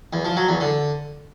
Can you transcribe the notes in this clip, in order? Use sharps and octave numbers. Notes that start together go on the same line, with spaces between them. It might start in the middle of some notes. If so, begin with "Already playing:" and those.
E2
F3
F#3
E2
D3